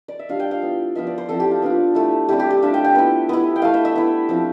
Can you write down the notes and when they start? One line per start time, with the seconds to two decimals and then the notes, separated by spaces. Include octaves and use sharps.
0.08 D5
0.19 E5
0.29 G3 D4 F4 F5
0.40 G5
0.51 F5
0.62 B3 E4
0.95 F3 B3 F4 E5
1.07 D5
1.18 C5
1.29 F3 C4 E4 A4
1.40 G4
1.51 F4
1.62 B3 D4 F4
1.95 A3 E4
2.29 G3 C4 E4 G4
2.40 G4
2.51 G4
2.62 A3 D4 F4 E5
2.74 G5
2.85 G5
2.95 B3 E4
3.29 B3 E4
3.56 G5
3.62 A3 E4 F5
3.74 E5
3.85 E5
3.95 B3 E4
4.29 F3 C4 F4